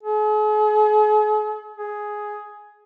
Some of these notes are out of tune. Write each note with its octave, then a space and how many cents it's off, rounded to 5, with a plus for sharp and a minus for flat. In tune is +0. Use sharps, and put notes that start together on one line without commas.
G#4 +45
G#4 +5